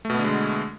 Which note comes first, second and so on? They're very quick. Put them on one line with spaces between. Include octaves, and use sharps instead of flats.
A3 B2 B3 D3 G#3